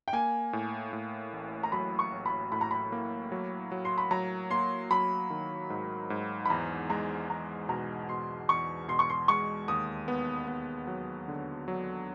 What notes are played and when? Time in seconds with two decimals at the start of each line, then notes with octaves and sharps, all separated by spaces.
0.08 G5
0.13 A#3 G#5
0.53 A2
0.93 A2
1.33 A1
1.63 A#5
1.72 F#3 B5
1.99 C#6
2.12 A1
2.26 B5
2.52 A2 B5
2.61 A#5
2.71 B5
2.92 A#3
3.32 F#3
3.72 F#3
3.85 C6
3.98 B5
4.11 F#3 A#5
4.51 A#3 C6
4.91 F#3 B5
5.30 D#3
5.70 G#2
6.10 G#2
6.45 B5
6.50 E2 A#5
6.90 G#3 A#5
7.29 E2 A#5
7.69 B2 A#5
8.09 B2 C6
8.49 E2 C#6
8.88 B2 C6
8.99 C#6
9.10 C6
9.28 G#3 C#6
9.68 D#2 D#6
10.08 B3
10.48 B3
10.87 F#3
11.28 D3
11.68 F#3